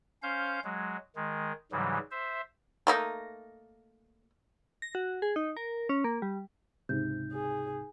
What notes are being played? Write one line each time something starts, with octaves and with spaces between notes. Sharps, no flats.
C#4 C5 F5 G6
F#3 G#3
D#3 G#3
G#2 C#3 E3 F#3 G3
C5 E5
A3 A#3 D#4
A#6
F#4
G#4
D#4
A#4
C#4
A#3
G3
C#2 G#2 C3 D#4 G6
G#4